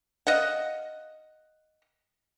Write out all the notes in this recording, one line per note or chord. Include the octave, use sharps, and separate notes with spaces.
D#5 F5 F#5